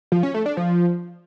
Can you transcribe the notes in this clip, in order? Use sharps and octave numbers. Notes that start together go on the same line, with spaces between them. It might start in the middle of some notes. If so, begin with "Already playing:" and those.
F3
C#4
A3
D4
F3